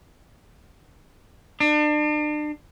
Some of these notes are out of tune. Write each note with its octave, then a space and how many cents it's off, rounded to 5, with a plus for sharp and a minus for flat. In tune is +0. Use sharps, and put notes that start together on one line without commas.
D4 +35